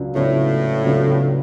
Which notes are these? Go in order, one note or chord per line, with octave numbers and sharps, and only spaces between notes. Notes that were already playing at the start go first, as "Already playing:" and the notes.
Already playing: C#2 C#3 F#3 D4
C#2 A2 C#3 F#3 B3 D4
C#2 C#3 F#3 B3 D4